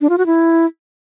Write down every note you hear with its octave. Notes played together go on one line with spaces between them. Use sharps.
D4
F4
F#4
E4